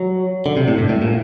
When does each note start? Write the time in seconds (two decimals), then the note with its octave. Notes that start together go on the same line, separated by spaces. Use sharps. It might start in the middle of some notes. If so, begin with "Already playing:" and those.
Already playing: F#3
0.46 D3
0.57 C3
0.68 A2
0.78 G2
0.89 A2
1.02 A#2